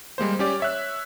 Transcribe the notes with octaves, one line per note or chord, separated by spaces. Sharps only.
G3 G#3 A#3 C5
C#4 G4 D5
C#5 E5 F#6